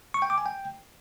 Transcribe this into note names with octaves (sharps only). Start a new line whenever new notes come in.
C#6
G5
D6
G#5
G5